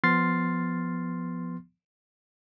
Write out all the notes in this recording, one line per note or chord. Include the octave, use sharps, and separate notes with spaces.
F3 B3 C6 F6 A6 C7